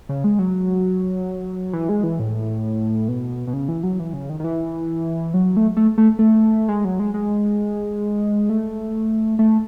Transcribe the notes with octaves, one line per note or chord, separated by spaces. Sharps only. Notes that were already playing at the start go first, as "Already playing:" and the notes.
C#3
G#3
F#3
E3
G#3
E3
A2
B2
B2
C#3
E3
F#3
E3
C#3
D#3
D#3
E3
F#3
A3
A3
A3
A3
G#3
F#3
G#3
G#3
A3
A3